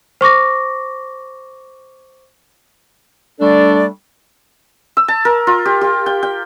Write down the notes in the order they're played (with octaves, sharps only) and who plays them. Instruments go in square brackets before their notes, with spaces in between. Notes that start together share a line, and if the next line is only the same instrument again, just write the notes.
[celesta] C5 C#6 D6 A#6
[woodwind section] G3 A3 D4 A4 D5
[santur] E6
A5
A#4
F4
G4
G4
G5
G5